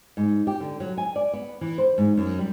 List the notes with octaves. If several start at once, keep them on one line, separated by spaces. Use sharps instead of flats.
G#2
G4
D3
F#3
G#5
D5
B3
E3
C5
G#2
F#2
G3